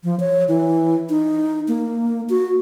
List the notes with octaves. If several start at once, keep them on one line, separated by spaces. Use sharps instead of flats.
F3
C#5
E3
D#4
A#3
F#4